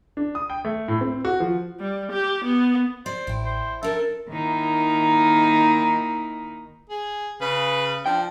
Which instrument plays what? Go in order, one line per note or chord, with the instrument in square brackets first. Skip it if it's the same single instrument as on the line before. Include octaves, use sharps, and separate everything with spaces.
[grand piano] D4
D#6
G5
A3
A2
C4
F#4
F3
[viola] G3
G4
B3
[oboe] C5 [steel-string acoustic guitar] D5
[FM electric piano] A1 [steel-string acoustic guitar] E4 G5
[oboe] C5
[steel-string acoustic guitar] D4 A#4 A5 [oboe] A4 [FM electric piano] E5
[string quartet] D#3 A#3 D#4 E4
[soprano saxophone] G#4
[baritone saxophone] C#3 [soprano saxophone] B4
[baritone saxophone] F3 [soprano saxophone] D4 [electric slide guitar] G5